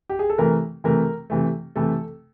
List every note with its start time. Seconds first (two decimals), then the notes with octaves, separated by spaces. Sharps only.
0.10 G4
0.19 G#4
0.30 A4
0.38 C3 E3 A3 A#4
0.84 C3 E3 A3 A#4
1.30 C3 E3 A3
1.76 C3 E3 A3 A4